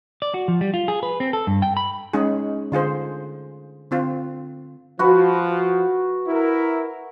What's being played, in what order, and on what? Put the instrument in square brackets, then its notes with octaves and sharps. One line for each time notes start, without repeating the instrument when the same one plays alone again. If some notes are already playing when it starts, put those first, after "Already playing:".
[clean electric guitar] D5
F#4
F3
G3
F4
G#4
B4
C4
A4
G2
G5
B5
[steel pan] G#3 C#4 D#4 G#4
D3 F4 G#4 C5
D3 C4 F4
[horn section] F3 [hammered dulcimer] F#4 B4
[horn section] E4 A#4